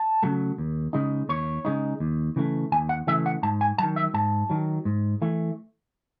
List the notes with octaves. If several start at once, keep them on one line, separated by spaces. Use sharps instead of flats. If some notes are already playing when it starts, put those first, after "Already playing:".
Already playing: A5
C#3 F#3 A3
D#2
C#3 G#3 D#4
D#2 C#5
C#3 G#3 D#4
D#2
C#3 E3 A3
D#2 G#5
F#5
C#3 E3 A3 E5
F#5
G#2 A5
G#5
D#3 F#3 A5
E5
G#2 A5
D#3 F#3
G#2
E3 A3